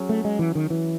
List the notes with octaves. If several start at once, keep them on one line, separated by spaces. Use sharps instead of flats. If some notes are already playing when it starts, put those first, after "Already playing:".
Already playing: F#3 C#4 G#4
A3
G#3
E3
D#3
E3